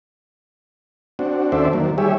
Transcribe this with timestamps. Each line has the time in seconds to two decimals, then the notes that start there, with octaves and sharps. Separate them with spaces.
1.19 C4 D4 F#4
1.52 D#2 C#4 A4 C5 D5 E5
1.73 D#3 F#3 A#3
1.98 G3 G4 G#4 C#5 E5